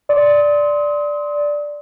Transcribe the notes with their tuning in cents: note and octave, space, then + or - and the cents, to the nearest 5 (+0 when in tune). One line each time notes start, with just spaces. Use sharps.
D5 +0 C6 +0 D#6 +40